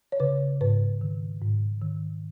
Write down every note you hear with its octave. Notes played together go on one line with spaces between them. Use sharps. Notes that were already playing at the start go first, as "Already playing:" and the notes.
C#5
C#3 B4
G#2 B4
D#3
G#2
D#3